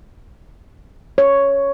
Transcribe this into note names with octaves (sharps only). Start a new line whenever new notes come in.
C#5